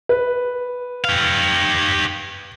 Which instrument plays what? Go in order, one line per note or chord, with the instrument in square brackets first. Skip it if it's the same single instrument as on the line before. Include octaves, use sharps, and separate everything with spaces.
[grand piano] B4
[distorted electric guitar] G4 F5